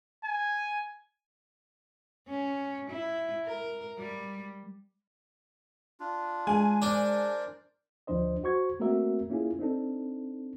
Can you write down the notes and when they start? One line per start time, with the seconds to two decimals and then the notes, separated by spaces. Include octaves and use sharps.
0.25 G#5
2.29 C#4
2.91 E4
3.45 A#4
3.98 G3
6.00 D4 F4
6.47 G#3 G#5
6.82 D4 A#4 C5 D5
8.07 D2 F3 D4 C5 D#5
8.43 F#4 C5 C#6 G#6
8.80 A3 A#3 C4 F#4 A#4 E5
9.30 A#3 C#4 E4 F4 G#4
9.59 C4 D4 D#4 A4